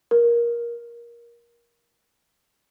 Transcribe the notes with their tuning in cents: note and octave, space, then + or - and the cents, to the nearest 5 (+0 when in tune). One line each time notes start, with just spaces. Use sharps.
A#4 +20